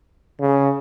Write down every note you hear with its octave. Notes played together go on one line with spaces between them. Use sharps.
C#3